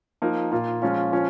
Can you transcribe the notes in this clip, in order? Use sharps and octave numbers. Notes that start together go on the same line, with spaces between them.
F3 A#3 D#4
A#2 A#3 F4
F3 G#3 C#4 F4
F3 C#4 F4